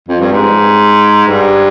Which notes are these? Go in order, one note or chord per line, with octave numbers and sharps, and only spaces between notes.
F2
G2
G#2
G2